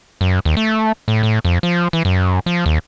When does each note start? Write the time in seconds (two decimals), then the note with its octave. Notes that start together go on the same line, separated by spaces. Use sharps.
0.21 F#2
0.45 D#2
0.57 A3
1.08 A2
1.23 A2
1.45 F2
1.63 F3
1.93 E3
2.05 F#2
2.46 F3
2.66 D#2